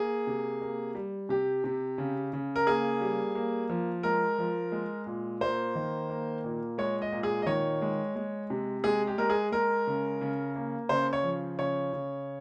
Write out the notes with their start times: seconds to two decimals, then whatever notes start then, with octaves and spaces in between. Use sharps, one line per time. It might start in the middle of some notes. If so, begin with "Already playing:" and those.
Already playing: A#3 G#4
0.27 C3
0.62 A#3
0.95 G3
1.29 C3 G4
1.64 C3
1.98 C#3
2.33 C#3
2.56 A#4
2.67 A#3 G#4
3.01 G3
3.35 A#3
3.69 F3
4.03 G#3 A#4
4.38 F3
4.72 G#3
5.07 A#2
5.41 A#3 C5
5.75 D#3
6.10 A#3
6.44 A#2
6.78 G#3 C#5
7.02 D#5
7.12 A#2
7.23 G#4
7.42 D#5
7.46 D#3 C#5
7.82 G#3
8.16 G#3
8.50 C3
8.84 G#3 G#4
9.07 G4
9.18 G#3 A#4
9.30 G#4
9.52 G#3 A#4
9.87 C#3
10.21 C#3
10.56 A#3
10.89 C#3 C5
11.13 C#5
11.23 F3
11.59 C#3 C#5
11.93 C#3